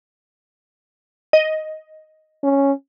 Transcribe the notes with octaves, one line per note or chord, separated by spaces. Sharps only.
D#5
C#4